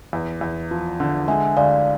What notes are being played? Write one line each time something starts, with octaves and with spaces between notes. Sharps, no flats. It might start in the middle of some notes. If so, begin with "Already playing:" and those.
E2
E2
F3
D3
G#3 E5 G#5
D2 D5 F5